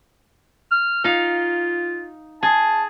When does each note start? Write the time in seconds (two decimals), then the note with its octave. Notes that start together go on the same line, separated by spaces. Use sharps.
0.72 F6
1.04 D#4 F4 F5
2.43 G#4 A5